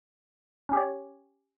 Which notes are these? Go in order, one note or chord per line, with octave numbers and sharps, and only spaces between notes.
C#4 G4 C#5